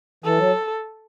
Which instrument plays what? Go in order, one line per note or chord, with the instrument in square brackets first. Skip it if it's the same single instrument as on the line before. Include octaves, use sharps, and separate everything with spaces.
[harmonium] E3 [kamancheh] A4
[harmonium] F#3